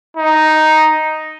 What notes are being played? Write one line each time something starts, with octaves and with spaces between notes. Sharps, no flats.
D#4